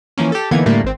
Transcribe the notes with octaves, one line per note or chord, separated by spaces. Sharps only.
E3 F3 A#3 C#4
G4 A4
D3 E3 A#3 B3 D#4 G#6
A2 D3 G3 A3 A#3
G#1 C4